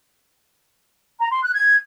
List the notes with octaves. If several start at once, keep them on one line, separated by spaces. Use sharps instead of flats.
A#5
C6
F#6
G#6